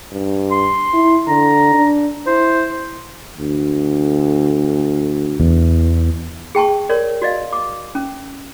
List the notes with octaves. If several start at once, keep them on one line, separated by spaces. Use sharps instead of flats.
G2
C6
E4
D3 A#5
D4
E4 C5
D2
E2
G#4 G5 A5 C#6
A#4 C#5 D5
F#4 D5 D#5 F5
D6
C#4